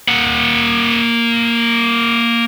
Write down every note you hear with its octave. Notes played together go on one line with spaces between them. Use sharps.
A#3 F#5